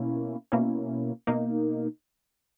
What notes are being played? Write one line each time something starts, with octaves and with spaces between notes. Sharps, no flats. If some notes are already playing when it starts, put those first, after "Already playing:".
Already playing: B2 A#3 C#4 E4
B2 A#3 C#4 E4
B2 A#3 D#4